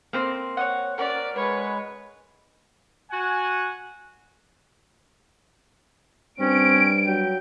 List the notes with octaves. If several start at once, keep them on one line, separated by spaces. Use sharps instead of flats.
A#3 C4 C5
C#5 D#5 F#5
C#4 F#4 A#4 D5
G#3 B4 C#5
F#4 F#5 G#5
G2 C4 C#4 D7
F#3 G5